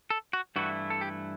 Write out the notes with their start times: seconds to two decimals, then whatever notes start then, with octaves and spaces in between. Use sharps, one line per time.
0.10 A4
0.33 F#4
0.56 G2 E3 A3 E4 F#4
0.90 A4
1.01 G4